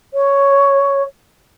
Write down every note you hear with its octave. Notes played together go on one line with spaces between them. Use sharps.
C#5